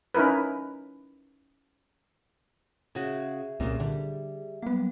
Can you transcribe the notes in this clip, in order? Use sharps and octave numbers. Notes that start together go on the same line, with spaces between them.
C#4 D#4 E4 A#4 B4
C#3 F#4 G#4 E5
C2 A#2 C#3 C4
D3 G3
F#3 G3 A#3 B3